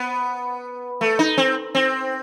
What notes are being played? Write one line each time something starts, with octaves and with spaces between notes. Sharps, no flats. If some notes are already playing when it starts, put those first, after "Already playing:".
Already playing: B3
A3
D#4
C4
C4